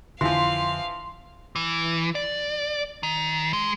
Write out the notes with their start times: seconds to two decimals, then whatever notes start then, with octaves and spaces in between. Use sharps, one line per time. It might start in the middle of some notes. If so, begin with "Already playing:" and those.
0.21 F2 D3 E3 F3 F5 C6
1.56 E3
2.15 D5
3.03 D#3
3.53 G#3